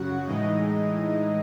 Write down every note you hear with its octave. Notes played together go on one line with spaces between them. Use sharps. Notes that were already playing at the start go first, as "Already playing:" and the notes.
Already playing: F#2 C#3 F#3 F#4 F#5
A2 E3 G#3 D#4 D#5